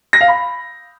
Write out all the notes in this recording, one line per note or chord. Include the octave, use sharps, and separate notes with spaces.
A#6
F5
B5